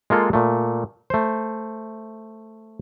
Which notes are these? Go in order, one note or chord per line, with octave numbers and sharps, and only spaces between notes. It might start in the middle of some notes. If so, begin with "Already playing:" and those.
G#3 A#3 F4 A4
A#2 A3
A3 C5